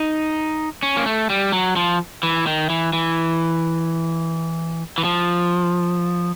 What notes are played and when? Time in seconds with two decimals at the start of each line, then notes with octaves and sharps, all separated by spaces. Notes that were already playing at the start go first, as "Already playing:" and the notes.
Already playing: D#4
0.83 C#4
0.97 A#3
1.06 A3
1.30 G3
1.52 F#3
1.76 F3
2.23 E3
2.47 D#3
2.70 E3
2.93 E3
4.98 E3
5.05 F3